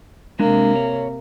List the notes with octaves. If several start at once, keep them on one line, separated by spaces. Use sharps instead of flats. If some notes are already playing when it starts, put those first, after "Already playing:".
C3 G#3 A#3 D4
C#5